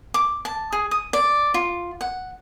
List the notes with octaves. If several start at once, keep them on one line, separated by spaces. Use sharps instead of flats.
D6
A5
G#4
D#6
D5
F4
F#5